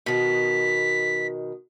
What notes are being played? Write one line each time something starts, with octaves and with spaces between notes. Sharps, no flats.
B2 D#3 B6